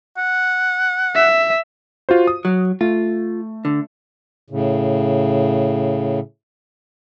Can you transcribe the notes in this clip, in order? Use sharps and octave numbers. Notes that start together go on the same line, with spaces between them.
F#5
E5
F4 F#4 C5
D#6
F#3
A3 F4
D3
A2 C#3